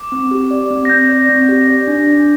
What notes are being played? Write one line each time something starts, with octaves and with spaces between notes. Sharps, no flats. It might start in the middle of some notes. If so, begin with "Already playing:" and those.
Already playing: D6
C4
G4
D5
C4
A#6
C4 G6
D5
C4
G4
D5
D4
D4